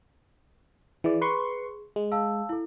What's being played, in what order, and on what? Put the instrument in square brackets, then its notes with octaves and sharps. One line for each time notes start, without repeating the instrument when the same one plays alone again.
[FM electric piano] E3 D5 [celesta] G#4
[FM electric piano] B4 C6 C#6
G#3
[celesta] F5 A5 E6
E4 A4